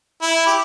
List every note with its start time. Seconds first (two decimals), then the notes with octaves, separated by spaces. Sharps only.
0.22 E4
0.46 G4